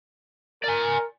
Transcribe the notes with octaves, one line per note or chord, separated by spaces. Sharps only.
A#4 D5 G#5